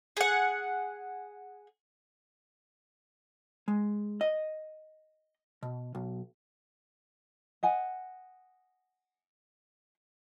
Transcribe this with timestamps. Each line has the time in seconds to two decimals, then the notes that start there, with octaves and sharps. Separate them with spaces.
0.17 G#4 F#5
3.68 G#3
4.21 D#5
5.63 B2
5.95 B1
7.63 D#5 F#5 G#5